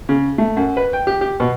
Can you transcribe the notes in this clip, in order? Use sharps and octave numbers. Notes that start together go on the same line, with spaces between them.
C#3
A3
F#2
B4
G5
G4
G4
B2